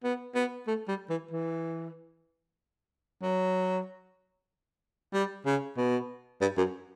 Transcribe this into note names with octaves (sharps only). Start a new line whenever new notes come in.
B3
B3
A3
G3
E3
E3
F#3
G3
C#3
B2
G2
F#2